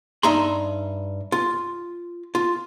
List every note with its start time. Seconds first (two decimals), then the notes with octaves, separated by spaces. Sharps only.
0.23 G2 D#4 E5 A#5 C6
1.32 F4
2.35 F4